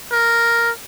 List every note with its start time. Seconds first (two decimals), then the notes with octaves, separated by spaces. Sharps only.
0.12 A#4